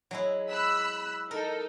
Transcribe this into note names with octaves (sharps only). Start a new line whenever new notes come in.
F#3 G#3 E4
B5 E6 F#6
D#4 A4 A#4